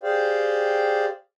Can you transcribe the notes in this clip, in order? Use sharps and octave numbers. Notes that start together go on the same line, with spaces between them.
G4 G#4 C5 D5 F5 G5